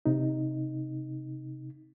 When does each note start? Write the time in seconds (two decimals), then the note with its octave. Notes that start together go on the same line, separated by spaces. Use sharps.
0.06 C3 D#4